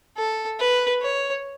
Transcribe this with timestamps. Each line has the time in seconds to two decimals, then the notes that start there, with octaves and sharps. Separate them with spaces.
0.17 A4
0.59 B4
1.02 C#5